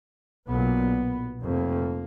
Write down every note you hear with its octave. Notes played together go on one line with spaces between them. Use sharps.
B1 A#2 B3
F1 F2 A#3